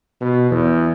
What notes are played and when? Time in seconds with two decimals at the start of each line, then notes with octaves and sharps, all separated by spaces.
0.21 B2
0.51 E2